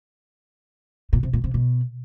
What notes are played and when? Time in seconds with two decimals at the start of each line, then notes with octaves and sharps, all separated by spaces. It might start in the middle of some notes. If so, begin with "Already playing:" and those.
1.13 A#2
1.23 C3
1.33 A#2
1.44 C3
1.54 B2